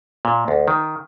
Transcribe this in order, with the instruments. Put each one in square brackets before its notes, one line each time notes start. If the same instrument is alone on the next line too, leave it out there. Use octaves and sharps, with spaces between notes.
[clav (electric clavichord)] A#2
D2
D#3